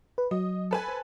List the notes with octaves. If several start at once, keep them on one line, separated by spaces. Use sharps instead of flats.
B4
F#3 D#5
A4 B4 G#5
C5